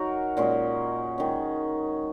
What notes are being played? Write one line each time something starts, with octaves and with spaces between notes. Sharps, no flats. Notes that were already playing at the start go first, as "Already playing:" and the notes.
Already playing: F#3 D#4 F#4 A#4
A#2 G#3 C#4
D#3 G#3 C#4